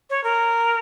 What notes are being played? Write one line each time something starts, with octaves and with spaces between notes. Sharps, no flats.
C#5
A#4